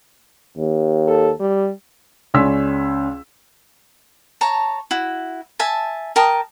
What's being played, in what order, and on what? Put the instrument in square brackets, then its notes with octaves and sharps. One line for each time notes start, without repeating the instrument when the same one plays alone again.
[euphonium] D#2
[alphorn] A4
G3
[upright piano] C#2 C#4 D5 C6 E6 B6
[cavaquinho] C#5 A5 A#5
E4 F#4
E5 G#5 A5
A#4 G5 A5 D#6